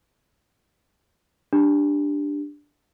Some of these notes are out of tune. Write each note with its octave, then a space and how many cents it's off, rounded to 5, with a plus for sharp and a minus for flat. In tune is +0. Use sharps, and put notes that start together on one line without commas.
D4 +0 G4 +15